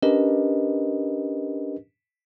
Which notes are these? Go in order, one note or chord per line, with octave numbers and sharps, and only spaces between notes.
C#4 D4 G4 A#4 B4 D#5